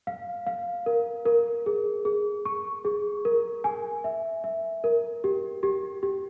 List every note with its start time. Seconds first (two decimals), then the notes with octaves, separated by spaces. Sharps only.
0.07 F5
0.47 F5
0.86 A#4
1.25 A#4
1.66 G#4
2.05 G#4
2.45 C#6
2.85 G#4
3.25 A#4
3.64 G#5
4.04 E5
4.44 E5
4.84 A#4
5.24 G4
5.63 G4
6.03 G4